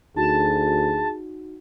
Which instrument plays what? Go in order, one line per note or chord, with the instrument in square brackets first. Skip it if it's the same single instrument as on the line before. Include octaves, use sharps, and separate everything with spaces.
[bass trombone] D2 [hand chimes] D#4 F#4 [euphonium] G#4 [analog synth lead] A5